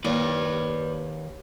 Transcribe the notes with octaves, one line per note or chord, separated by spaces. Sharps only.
D#2 B4 D5